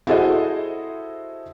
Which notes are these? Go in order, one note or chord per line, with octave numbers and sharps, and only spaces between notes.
E4 F#4 G#4 A4 C5 D#5